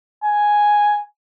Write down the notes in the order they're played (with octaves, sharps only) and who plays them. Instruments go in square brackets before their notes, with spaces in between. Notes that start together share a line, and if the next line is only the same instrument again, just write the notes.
[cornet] G#5